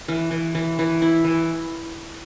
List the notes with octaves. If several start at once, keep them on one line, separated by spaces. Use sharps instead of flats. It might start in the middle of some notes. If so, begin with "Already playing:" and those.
E3
E3
E3
E3
E4
E3